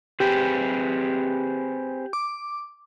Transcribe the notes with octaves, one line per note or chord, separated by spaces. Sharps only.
C4 G4 G#4 B4
D6